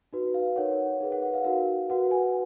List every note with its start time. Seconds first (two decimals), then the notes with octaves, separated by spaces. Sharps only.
0.13 D#4 F#4 B4
0.34 F5
0.56 D#4 A#4 C#5 F#5
1.00 D#4 G#4 B4
1.12 F#5
1.22 F#5
1.34 F5
1.45 D#4 F#4 A#4 F5
1.90 F#4 B4 F#5
2.11 G#5